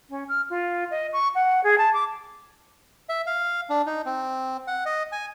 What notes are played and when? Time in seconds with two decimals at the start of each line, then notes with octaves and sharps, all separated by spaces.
0.10 C#4
0.29 F6
0.50 F4
0.91 D#5
1.13 C#6
1.35 F#5
1.64 G#4
1.78 A5
1.94 D6
3.09 E5
3.27 F5
3.70 D4
3.87 D#4
4.06 C4
4.67 F#5
4.85 D#5
5.12 G#5